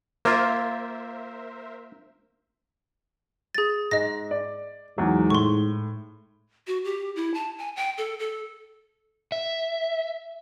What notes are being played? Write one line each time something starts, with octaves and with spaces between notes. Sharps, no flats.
A#3 F4 A#4 C5 E5
G#4 A6
G#2 G#3 D#5 A#6
D5
E2 G#2 F#3
A2 C6 C#6
F#4
G4
E4
A5
G#5
G5
A4
A4
E5